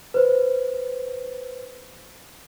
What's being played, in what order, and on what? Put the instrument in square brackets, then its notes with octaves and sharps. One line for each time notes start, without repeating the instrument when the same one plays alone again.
[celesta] B4 C5